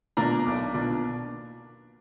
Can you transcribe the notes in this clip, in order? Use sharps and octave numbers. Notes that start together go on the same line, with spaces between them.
B2 A#3 D4 F4 A#5
B1 D6
B2 A#3 D4 F4